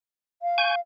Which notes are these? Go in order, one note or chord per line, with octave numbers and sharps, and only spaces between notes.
F5
G#5 C#6 G6